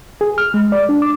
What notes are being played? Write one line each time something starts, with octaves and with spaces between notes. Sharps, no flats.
G#4
F6
G#3
D5
D4
D6